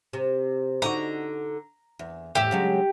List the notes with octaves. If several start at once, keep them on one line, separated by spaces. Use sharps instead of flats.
C3
D3 D#4 F#4 A#5
E2
E2 A2 G4 E5
C#3 F#3 G#3